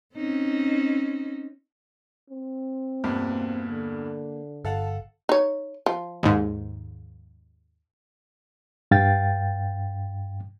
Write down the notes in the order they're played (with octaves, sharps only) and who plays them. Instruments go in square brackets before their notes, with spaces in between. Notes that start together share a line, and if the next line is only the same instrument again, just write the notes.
[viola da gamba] C4 C#4 D#4
[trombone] C4
[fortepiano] E2 G2 B2 [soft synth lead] A#3
[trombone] D3
[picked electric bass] G1 [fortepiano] A4 F5 F#5 [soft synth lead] A5
[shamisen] D#4 C#5
F3
[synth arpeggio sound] D#2 G#2
[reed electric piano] G2 F5 G5 A6